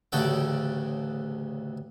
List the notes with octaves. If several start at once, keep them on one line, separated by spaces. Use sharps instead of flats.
A1 D2 C#3 F#4 A4 G5